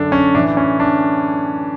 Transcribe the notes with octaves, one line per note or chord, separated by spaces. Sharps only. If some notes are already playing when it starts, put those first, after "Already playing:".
Already playing: F#2 D3 D4 A4
C#4
A2 E3 D4
C#4
D4